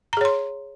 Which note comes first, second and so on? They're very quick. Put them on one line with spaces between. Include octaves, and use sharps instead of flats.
A#5 G#4 C#5 C6